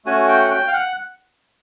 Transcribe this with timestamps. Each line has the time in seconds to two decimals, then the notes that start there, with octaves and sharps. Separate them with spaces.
0.05 A3 C#4 F#4 G#5
0.28 G5
0.40 F#5
0.51 G5
0.67 F5
0.73 F#5